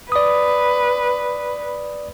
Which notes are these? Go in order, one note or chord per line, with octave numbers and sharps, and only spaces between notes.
B4 D5 D#6